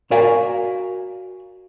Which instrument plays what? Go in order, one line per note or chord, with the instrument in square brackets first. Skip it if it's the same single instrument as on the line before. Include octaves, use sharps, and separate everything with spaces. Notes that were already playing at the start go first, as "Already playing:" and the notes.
[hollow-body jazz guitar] F#4 A#4 D5 F5 G#5